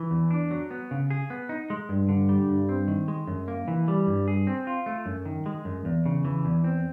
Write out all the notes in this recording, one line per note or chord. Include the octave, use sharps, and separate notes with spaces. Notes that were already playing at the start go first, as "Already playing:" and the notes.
Already playing: E3
E2
D4
F#3
B3
C#3
G#4
B3
D#4
G#3
G2
D3
G3
G2
C4
D#3
G#3
F#2
A#3
E3
G3
G2
G#4
C4
F4
A3
F#2
D#3
G#3
F#2
E2
C#3
E3
E2
C4